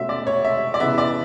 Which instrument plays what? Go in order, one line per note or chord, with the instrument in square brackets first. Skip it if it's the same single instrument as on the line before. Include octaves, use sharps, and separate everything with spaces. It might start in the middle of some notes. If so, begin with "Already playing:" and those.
Already playing: [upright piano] B2 A3 C#4 E5
D5
C#5
E5
D5
C#3 E3 B3 E5
D5